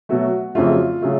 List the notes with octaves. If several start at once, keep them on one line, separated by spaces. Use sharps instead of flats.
B2 F#3 A3 F#4
F2 C#3 F#3 A3 F4
C#3 F#3 A3